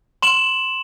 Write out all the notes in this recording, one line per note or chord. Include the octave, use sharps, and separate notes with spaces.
C6 E7 F#7